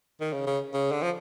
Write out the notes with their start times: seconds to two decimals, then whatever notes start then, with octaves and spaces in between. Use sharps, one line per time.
0.21 D#3
0.33 C#3
0.47 C#3
0.74 C#3
0.92 D3
1.02 F3